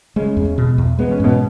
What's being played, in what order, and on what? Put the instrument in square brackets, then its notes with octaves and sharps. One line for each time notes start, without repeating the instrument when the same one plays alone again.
[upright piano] C#3 C#4 [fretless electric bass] G#3
[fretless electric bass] E2
B2
E2
[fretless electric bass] G#3 [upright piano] B3
[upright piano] C#4
[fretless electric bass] G#2 [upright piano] B2 B3